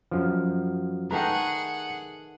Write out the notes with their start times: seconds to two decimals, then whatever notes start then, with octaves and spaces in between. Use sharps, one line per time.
0.11 F#2 F3
1.11 D#3 A3 G#4 B4 F#5 A#5